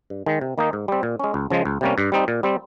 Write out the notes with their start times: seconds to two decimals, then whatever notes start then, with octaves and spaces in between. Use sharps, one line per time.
0.10 G2
0.26 D#3 G#3
0.41 C3
0.58 D#3 A#3 D#4
0.73 G#2
0.88 G3 C4
1.03 A#2
1.19 G#3 C#4
1.34 C#2
1.50 C#3 F3 G#3
1.65 C#2
1.81 C3 G3 A#3 C#4
1.98 G2
2.12 G3 C4 D#4
2.28 A#2
2.43 G3 C4